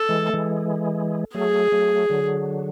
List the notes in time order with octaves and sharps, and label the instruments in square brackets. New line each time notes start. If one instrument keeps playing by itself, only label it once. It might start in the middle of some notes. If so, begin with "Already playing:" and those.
Already playing: [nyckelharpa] A4
[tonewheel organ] E3 G#3
A3
E3 G#3
[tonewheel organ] F#3 A3 [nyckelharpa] G#4
[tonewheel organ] F#3 A3
D3 F#3